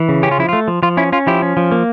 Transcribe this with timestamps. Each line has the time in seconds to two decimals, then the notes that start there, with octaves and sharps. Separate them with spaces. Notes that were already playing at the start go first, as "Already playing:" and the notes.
Already playing: E3
0.09 C#3
0.23 C#4 G4
0.31 F4
0.39 F3 E4
0.49 A3 F4
0.68 F3
0.83 F3 F4
0.97 C#4 E4
1.12 C#4 F4
1.27 F3 E4 G4
1.42 C#4
1.57 F3
1.72 A#3